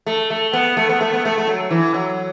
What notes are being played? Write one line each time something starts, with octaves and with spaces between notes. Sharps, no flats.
A3
A3
B3
A3
B3
A3
B3
A3
A3
F#3
E3
F#3